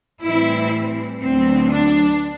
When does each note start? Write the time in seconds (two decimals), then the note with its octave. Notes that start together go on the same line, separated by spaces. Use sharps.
0.23 A2 E3 G3 C4 E4
1.22 D2 D3 F#3 B3 C4
1.71 D4